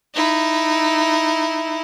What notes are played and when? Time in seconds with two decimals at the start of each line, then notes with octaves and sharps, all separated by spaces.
0.15 D#4 E4